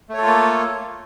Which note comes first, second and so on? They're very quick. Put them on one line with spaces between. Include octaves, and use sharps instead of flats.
A3 C#5 A4 F4 A#3